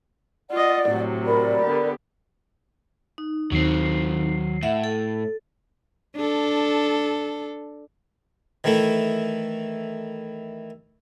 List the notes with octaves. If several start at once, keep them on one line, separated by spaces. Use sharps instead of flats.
F4 D5 D#5 F#5
A2 C3 F#3
A#4 D5 B5
D3 B3 G4
D#4
D#2 D#3 F#3 C4 C7
A2 E5 F#5
A4
D4 A4
D#3 E3 A3 E4 A4